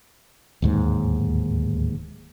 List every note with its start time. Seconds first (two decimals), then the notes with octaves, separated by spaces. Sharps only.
0.62 D1 D#2 G#2